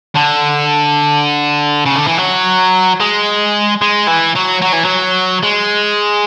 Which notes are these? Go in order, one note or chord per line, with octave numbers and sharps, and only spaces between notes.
D3
C#3
D3
E3
F#3
G#3
G#3
E3
F#3
F#3
E3
F#3
G#3